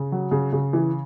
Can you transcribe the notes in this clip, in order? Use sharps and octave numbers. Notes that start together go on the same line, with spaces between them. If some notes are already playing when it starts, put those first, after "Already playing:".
Already playing: C#3
F#3
C#3
C#3
E3